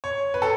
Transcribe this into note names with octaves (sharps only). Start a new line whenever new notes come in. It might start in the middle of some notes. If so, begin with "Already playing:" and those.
C#5
B4
A4